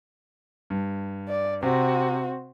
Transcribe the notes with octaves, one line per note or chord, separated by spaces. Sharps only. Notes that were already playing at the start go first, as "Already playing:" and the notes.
G2
D5
C3 C4 F#4